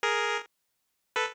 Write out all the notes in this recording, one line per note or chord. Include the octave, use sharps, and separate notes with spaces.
G#4 A#4
A4 B4